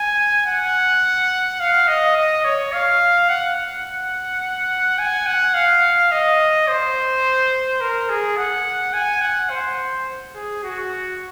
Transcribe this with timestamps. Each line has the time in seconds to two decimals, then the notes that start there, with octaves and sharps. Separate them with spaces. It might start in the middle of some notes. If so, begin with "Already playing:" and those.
Already playing: G#5
0.46 F#5
1.60 F5
1.88 D#5
2.16 D#5
2.44 C#5
2.73 F5
3.29 F#5
4.98 G#5
5.27 F#5
5.54 F5
6.12 D#5
6.68 C5
7.81 A#4
8.09 G#4
8.37 F#5
8.93 G#5
9.21 F#5
9.50 C5
10.35 G#4
10.63 F#4